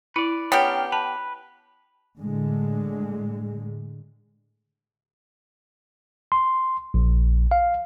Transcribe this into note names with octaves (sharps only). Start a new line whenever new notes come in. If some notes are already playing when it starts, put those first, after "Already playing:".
E4 B4 D5
B3 C#4 D4 G4 A#4 C#5 G5
B4 A5
A2 D3 G#3
C6
A#1
F5